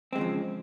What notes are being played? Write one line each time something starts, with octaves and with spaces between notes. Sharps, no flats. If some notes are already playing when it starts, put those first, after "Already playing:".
C#3 F3 G#3 C4